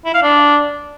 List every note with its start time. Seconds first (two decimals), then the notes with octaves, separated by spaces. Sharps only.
0.05 E4
0.14 F5
0.23 D4